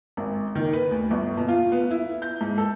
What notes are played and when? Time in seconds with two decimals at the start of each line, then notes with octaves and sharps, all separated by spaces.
0.17 G#1
0.55 D#3
0.73 B4
0.91 D2
1.11 G1
1.37 B2
1.49 F4
1.72 B3
1.91 E4
2.22 G6
2.41 G#2
2.58 A4